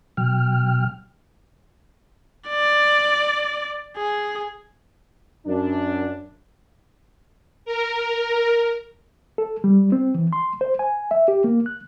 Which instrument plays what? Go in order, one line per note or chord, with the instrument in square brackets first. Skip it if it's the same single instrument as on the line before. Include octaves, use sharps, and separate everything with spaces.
[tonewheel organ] B2 F#3 G5 F6
[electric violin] D5
G#4
[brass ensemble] F#2 D4
[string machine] A#4
[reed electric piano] A4
G3
C4
E3
C6
C5
G#5
E5
G4
A#3
F#6